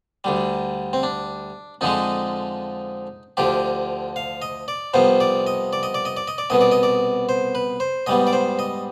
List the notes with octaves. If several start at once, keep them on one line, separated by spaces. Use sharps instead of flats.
D2 D3 G3
C4
D4
F2 D3 F3 G#3 D#4
D2 D3 F3 G4
F5
D#5
D5
C2 C3 F3 B3 C5
D5
D#5
D5
D#5
D5
D#5
D5
D#5
D5
C2 B2 B3 D#5
D5
D#5
D5
C5
B4
C5
G#2 G3 B3 D#5
D5
C5
D#5